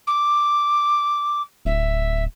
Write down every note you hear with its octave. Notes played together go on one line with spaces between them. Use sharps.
D6
D1 E5